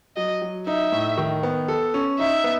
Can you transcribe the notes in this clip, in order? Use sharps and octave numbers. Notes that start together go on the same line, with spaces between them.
F#3 D#5
F#3
D#4 E5
A2
D#3
B3
A4
C#4
D#4 E5
B3